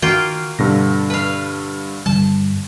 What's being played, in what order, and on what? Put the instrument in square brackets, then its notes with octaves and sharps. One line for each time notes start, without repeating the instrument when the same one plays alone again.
[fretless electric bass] D#3 [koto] A#3 F4 G5 [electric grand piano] F#4
[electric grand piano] G2 D3 A#6 [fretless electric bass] B2 C4
[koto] B4 F5
[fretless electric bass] G2 D3 G3 [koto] A5